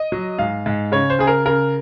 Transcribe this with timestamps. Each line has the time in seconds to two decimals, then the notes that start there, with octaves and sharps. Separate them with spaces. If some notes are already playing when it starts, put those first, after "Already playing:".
Already playing: D#5
0.12 F#3
0.38 G#2 F5
0.66 G#2
0.92 C#3 C#5
1.10 C5
1.19 C#3 G#4
1.27 A#4
1.46 C#3 A#4